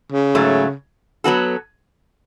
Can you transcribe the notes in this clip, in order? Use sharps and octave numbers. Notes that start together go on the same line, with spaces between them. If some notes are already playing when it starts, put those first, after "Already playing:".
C#3
G#2 F#3 A3
F#3 B3 F#4 A4